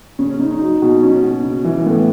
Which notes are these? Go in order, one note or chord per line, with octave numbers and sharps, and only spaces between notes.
C#3 C#4
C#4
C#3 D#4
D#4
F#3 D#4
B2
F#3 C#4
B2
C#3
E3
A2 B3